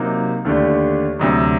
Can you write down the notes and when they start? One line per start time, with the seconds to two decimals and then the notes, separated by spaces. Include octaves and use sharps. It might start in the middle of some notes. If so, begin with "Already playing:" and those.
Already playing: C3 F#3 A#3 D#4
0.45 D#2 D3 A3 D4 G4
1.19 D2 C3 F#3